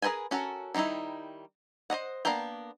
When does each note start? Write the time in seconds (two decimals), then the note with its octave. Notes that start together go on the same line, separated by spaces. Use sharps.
0.02 G#4 A#4 B4 G5 G#5
0.31 C#4 F#4 A4 A#4
0.74 D#3 G3 C#4 D#4 E4
1.90 C5 C#5 D#5 F#5
2.25 A#3 B3 D4 A#4 G5